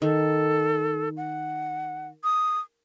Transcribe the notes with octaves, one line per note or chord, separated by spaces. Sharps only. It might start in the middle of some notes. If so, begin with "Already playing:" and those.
D#3 A4
F#5
D#6